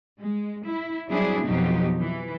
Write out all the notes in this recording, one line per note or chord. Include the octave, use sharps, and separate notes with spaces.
G#3
E4
F#3 G3 C4 D4 E4 G#4
F2 B2 F3 F#3 D#4 G4
E3